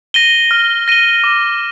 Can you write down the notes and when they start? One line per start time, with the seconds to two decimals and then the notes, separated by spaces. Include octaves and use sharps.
0.14 A#6 D#7 G7
0.51 F6
0.88 A#6 D#7 G7
1.24 D6